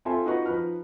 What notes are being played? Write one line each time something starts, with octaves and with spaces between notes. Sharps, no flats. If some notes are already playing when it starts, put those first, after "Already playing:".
C4 F4 A4 E5 G#5 C6
D#4 F4 F#4 B4 D#5 C#6
F3 D#4 B4 F6